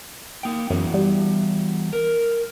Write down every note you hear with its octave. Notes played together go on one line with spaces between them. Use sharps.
A#3 G5
F#2 E3 B3 F#4
G3
A#4